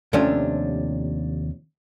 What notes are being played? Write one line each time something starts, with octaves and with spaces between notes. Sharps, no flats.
D#2 C3 F3 A3 C#4 D4